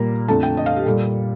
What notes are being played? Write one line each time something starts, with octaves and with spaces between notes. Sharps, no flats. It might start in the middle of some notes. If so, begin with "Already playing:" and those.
Already playing: A#2 G3 A#3 A#5
F2 D3 A3 A5
G5
D#5
F5
G4
A#2 G3 A4